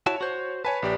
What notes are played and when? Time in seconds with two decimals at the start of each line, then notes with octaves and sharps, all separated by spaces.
0.06 E4 F#4 C#5 A5
0.21 F#4 C5
0.65 B4 C#5 G#5 A5
0.82 A#1 G4 D5